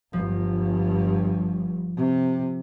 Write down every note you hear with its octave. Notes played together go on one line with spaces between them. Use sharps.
G1 G2 F3
C3